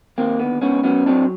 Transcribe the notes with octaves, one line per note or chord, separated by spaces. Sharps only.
D#2 A#3 C4
D3 B3
C#2 B3 C#4
F#3 B3 C#4
F#3 C4 D4